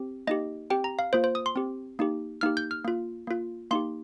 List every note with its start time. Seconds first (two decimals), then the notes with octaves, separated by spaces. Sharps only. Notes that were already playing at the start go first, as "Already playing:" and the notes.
Already playing: C4 G4
0.27 A#3 D#4 G4 D#5
0.70 C4 G4 G5
0.84 A#5
0.99 F5
1.13 A#3 F4 C5
1.24 C5
1.35 D#6
1.46 C6
1.56 C4 G4
1.99 A#3 D#4 G4
2.41 A#3 D#4 G4 F6
2.57 G6
2.71 F6
2.85 A#3 F4
3.27 A#3 F4
3.71 A#3 D#4 G4 C6